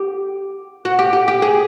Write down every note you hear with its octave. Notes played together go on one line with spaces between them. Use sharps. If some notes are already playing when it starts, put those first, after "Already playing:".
Already playing: G4
F#4
G4
G4
G4
G#4